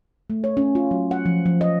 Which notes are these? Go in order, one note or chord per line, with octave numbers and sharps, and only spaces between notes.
A3
C#5
C#4
F4
F#3
F#5
F3
F3
D#5